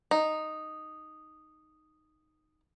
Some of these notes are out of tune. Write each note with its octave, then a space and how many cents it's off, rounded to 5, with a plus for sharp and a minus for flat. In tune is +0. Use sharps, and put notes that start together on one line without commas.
D#4 -5